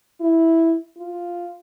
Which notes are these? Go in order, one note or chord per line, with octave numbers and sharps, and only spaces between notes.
E4
F4